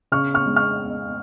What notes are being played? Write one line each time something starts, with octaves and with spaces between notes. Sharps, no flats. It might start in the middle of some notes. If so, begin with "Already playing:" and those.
C#3 C#6 F6
C#6 F6
G#3
C#6 F6